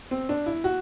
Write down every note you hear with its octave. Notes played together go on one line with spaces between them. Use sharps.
C4
D4
E4
F#4